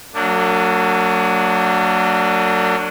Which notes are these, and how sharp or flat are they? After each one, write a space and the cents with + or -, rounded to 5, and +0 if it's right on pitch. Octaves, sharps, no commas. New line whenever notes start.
F#3 +0 A#3 -45 D4 -5